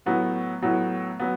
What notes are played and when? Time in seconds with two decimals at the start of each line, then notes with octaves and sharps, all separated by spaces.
0.06 A2 F#3 B3
0.62 A2 F#3 B3
1.20 F#3 B3